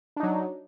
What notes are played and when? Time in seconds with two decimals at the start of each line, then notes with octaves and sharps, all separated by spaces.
0.16 D4
0.20 D#4
0.23 F#3